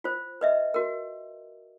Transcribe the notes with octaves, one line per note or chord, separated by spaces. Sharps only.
F4 C5
B4 D#5 E5
F#4 A#4